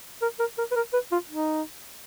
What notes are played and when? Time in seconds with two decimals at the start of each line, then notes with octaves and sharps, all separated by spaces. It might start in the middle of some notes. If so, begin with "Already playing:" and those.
0.22 A#4
0.39 A#4
0.58 A#4
0.71 B4
0.76 A#4
0.93 B4
1.12 F4
1.29 D#4